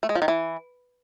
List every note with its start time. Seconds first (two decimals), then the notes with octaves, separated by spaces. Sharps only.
0.03 A3
0.09 G#3
0.15 F3
0.22 D#3
0.28 E3